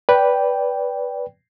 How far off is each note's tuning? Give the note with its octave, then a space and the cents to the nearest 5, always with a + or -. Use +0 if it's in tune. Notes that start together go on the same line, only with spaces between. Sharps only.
B4 -5 D5 -20 G5 +0